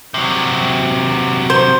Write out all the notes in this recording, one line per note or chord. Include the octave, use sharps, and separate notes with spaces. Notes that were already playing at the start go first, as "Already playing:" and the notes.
C3 F#3
C5